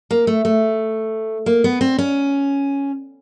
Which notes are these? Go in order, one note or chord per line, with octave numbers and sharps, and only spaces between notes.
A#3
A3
A3
A#3
B3
C4
C#4